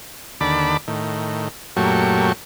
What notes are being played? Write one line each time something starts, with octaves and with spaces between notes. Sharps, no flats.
D#2 D3 A5 B5 D6
A2 D#3
F#2 A#2 F#3 A3 G4 C#6